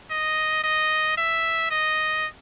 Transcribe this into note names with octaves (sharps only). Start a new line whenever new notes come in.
D#5
D#5
E5
D#5